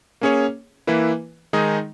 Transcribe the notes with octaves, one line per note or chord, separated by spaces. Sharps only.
A#3 C#4 G#4 C#5
E3 A#3 E4 B4
D#3 G#3 D#4 G#4 D#5